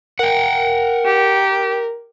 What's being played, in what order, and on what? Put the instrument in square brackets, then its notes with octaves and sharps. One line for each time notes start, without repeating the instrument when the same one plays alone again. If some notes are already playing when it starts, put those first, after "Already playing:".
[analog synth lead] A#4 [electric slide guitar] F#5 G5
[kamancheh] G4